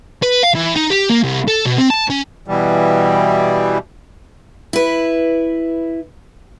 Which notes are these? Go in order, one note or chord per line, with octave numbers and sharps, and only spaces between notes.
B4
F5
E3
D#4
G4
A#3
C2
A4
B2
C4
A5
C#4
B2 E3 G3
E4 B4